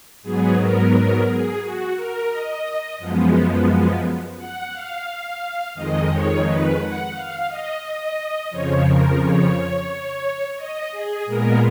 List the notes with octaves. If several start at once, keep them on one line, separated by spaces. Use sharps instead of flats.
G#2 F#3 B3 G#4
A#4
A#4
G#4
F#4
A#4
D#5
F#2 F3 G#3 B3
F#5
F5
F2 D#3 G#3 D#5
C#5
B4
F#5
F5
D#5
D#5
F2 C#3 F3 C#5
A#4
C#5
D#5
G#4
A#2 G#3 B3 A#4